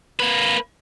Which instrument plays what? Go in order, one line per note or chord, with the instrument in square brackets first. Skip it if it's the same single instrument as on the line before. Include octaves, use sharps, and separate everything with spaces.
[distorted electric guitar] A#3 B4